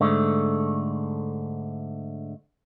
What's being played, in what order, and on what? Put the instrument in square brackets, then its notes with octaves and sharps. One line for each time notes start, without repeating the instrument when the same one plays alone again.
[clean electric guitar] G#2 D3 A3